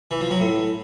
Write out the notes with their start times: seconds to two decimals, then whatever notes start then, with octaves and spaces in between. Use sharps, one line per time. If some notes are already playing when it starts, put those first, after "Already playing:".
0.11 E3
0.21 F3
0.30 F#3
0.40 A2